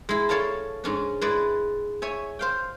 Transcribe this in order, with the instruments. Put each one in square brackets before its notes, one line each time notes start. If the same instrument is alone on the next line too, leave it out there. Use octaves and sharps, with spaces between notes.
[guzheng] G#3 E4
C#4 A4 C#5 D5 F5 A5
G#2 C#4 D4
G#3 E4 B4 D5
C#5 E5 G#5
C5 F5 G5